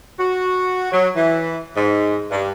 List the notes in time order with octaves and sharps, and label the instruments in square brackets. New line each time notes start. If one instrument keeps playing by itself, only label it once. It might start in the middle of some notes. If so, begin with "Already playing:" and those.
[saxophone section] F#4
F#3
E3
G#2
G2